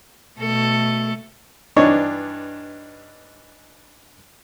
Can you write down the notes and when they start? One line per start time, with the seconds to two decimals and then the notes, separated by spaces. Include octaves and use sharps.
0.39 B2 A3 A4
1.76 G2 E3 D4 D#4 C#5 C#6